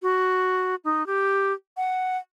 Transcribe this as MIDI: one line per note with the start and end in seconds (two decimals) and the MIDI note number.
0.02 0.75 66
0.84 1.06 63
1.06 1.53 67
1.77 2.18 78